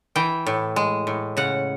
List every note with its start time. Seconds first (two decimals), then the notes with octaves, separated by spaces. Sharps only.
0.16 E3 G5
0.47 A2
0.76 G#3
1.07 A2
1.37 C#3 F#5